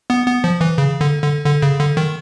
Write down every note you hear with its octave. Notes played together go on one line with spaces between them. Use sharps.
B3
B3
F3
E3
C#3
D3
D3
D3
C#3
D3
D#3